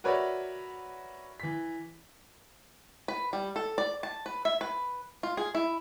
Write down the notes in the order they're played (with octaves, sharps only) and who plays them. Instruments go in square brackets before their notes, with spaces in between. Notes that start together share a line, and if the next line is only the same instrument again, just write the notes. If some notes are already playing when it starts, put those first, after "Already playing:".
[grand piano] F#4 A#4 B4 C#5 D5 E5
E3 B6
[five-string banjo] B4
G3
A4
D5
A5
B4
E5
B4
F4
G#4
E4